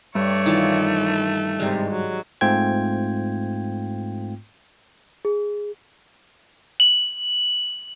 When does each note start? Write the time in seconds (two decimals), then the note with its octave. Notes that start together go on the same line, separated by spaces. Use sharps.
0.15 G2 A3 C#5 D5
0.46 D#3 E3 F4
1.59 G#2 C3 G3 G#3
1.90 F#3
2.41 G#2 A3 C4 F4 G5 G#6
5.25 G#4
6.80 F#7